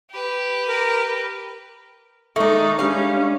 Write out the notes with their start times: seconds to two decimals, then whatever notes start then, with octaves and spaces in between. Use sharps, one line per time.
0.11 G4 B4
0.68 A#4
2.36 D#3 G#3 D4 D#4 A4 E5 C#6
2.79 G3 G#3 C#4 D4 F5